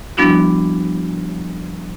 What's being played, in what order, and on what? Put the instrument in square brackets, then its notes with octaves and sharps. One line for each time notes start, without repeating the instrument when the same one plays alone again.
[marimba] F3 G3 B3 D4 E4 F#4